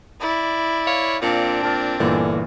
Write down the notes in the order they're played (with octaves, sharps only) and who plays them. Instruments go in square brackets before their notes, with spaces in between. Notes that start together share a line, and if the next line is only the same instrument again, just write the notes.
[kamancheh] E4 D5
[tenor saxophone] C#5 [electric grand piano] F5
[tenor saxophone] A#2 [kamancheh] C4 D4
[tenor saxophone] A#2 [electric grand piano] A5 F6 A6
[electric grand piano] G1 A#2 E3 [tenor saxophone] D3